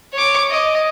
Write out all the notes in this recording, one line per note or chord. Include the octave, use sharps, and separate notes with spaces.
C#5 D6
D#5